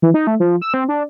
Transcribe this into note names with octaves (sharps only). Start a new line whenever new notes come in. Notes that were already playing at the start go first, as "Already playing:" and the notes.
E3
D#4
A3
F3
E6
C4
D4